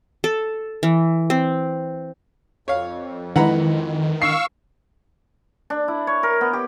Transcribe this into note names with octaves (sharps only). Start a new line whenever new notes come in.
A4
E3
C4
F2 C#5 F5
D#3 E3 G#3 F#5 A#5 B5
F5 C#6 E6 C7
D4
E4
C#5
A#4
B3
G4